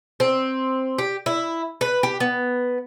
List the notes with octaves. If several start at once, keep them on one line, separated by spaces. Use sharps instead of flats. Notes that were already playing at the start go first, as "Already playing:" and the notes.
C4
G4
E4
B4
G4
B3